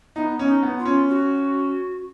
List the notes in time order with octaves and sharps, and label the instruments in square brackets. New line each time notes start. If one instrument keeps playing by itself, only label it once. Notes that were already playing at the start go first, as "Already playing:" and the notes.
[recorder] B3 [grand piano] D#4
[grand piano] C#4
[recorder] D#4
[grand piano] B3
[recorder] F4
[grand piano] C#4
[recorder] F#4